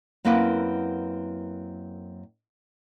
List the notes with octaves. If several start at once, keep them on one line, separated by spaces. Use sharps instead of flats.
F#2 A#3 C4 E4 B4 F#5